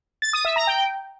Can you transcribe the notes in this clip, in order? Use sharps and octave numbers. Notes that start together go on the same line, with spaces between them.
A6
D#6
E5
A#5
G5